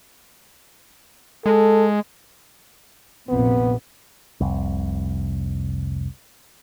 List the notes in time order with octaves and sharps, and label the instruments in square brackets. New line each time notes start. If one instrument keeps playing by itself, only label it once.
[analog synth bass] G#3 [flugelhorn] A4
[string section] A#1 F2 C3 [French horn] B3
[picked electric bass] F1 C2